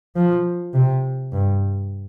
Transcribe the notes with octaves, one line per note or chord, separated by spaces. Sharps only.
F3
C3
G2